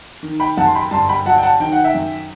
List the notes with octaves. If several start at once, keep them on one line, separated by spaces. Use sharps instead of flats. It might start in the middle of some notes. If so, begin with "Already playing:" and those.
D#3
G5 B5
F#2 F#5 A5
C6
G5 B5
G1 A5 C6
G5 B5
F#3 F#5 A5
G5
F#5 A5
D#3 G5
F#5
E5 G5
F#2